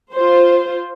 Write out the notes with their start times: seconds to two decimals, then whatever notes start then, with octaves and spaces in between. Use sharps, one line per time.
0.13 F4 C5